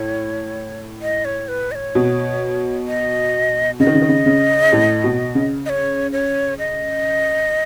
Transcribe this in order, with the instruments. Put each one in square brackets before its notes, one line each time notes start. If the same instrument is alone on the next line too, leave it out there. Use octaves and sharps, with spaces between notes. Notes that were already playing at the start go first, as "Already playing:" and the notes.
Already playing: [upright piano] A2 [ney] C#5
[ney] D#5
C#5
B4
D#5
C#5
[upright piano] B2
[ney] D#5
[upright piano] C#3 [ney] D#5
[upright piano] D#3
C#3
D#3
C#3
C#3
A2
B2
C#3
[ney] D#5
C#5
C#5
D#5